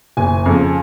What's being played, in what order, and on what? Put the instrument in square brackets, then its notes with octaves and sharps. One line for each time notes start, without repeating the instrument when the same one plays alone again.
[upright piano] F#1 G#5
F2 C#3